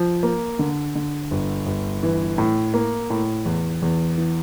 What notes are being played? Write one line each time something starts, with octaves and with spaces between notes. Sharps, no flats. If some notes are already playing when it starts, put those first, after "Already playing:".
Already playing: F3
A#3
D3
D3
G1
G1
E3
A2
A#3
A2
E2
E2
E3